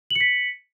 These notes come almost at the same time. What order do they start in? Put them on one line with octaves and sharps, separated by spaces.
F#7 C#7 B6